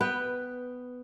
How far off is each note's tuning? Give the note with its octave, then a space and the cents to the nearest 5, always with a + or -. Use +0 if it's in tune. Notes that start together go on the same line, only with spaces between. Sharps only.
B3 +10 B4 +0 G5 +10